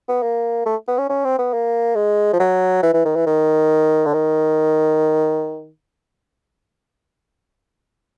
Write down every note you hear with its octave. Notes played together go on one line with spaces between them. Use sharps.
B3
A#3
A3
B3
C#4
C#4
C4
B3
A#3
G#3
F3
F#3
E3
E3
D#3
E3
D#3
D3
D#3